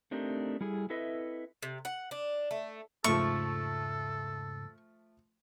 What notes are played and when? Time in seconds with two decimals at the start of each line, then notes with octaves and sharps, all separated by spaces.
0.11 A3 C4 D4 D#4 G4 A#4
0.61 G3 E4 G#4 A4
0.90 C4 E4 A4 B4 D#5 E5
1.63 C3
1.85 F#5
2.11 D4
2.51 A3
3.04 E2 G#2 C#3 F3 A3 A4 C#6